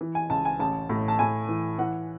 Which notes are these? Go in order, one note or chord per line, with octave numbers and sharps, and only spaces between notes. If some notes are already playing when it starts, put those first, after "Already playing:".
E3
G#5
C#2 A5
G#5
A1 A5
A2
A5
A2 G#5
E3
E3 F#5